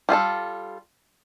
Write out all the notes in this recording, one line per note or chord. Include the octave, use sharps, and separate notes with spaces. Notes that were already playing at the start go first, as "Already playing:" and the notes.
G3 F4 G#4 A4